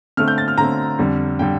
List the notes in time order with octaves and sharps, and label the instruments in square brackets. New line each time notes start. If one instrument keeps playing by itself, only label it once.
[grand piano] D3 A3 C4 F6
G6
A6
F6
D3 A3 C4 A#5
F2 D3 G3
D3 G3 G5